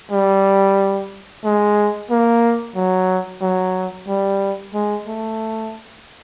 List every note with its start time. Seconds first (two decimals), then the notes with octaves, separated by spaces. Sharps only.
0.11 G3
1.44 G#3
2.10 A#3
2.76 F#3
3.41 F#3
4.08 G3
4.74 G#3
5.07 A3